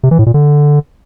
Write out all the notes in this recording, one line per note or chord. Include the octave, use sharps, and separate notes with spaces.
C3
E3
A2
A#2
D3